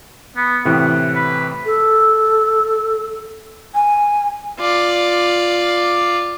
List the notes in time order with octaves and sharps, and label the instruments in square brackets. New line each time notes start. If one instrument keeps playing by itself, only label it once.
[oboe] B3
[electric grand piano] A2 C3 E3 [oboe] F#5
[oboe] B4
[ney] A4
G#5
[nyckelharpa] F4 D5